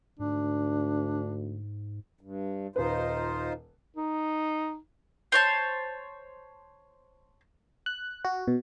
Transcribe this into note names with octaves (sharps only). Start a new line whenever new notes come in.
D2 G#2 D4
G2
D#1 D#4 F4 B4 C5
D#4
C5 C#5 A5
F#6
F#4
B2